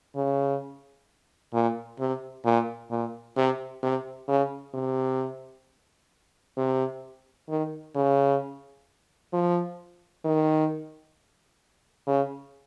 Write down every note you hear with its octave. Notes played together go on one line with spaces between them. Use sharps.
C#3
A#2
C3
A#2
A#2
C3
C3
C#3
C3
C3
D#3
C#3
F3
D#3
C#3